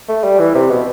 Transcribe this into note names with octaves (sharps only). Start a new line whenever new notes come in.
A3
G3
E3
C3
B2